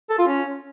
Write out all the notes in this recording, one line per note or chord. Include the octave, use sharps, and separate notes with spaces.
A4
F4
C#4